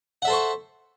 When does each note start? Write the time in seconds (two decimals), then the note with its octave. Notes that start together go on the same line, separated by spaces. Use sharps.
0.22 F#5
0.25 E5
0.27 A4
0.30 C5
0.32 C#6